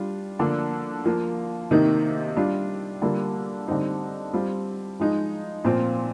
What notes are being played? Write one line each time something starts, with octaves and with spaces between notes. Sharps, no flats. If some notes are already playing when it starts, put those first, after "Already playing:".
Already playing: G3 D4 F4
D3 F3 A#3 D4
F3 A#3 F4
C3 D#3 A#3 D#4
G3 D4 F4
D3 G3 A#3 F4
D3 G3 C4 D#4
G3 C4 F4
F3 G#3 D#4
A#2 F3 C4 F4